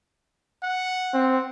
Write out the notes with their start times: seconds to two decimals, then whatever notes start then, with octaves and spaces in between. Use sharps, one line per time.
0.63 F#5
1.14 C4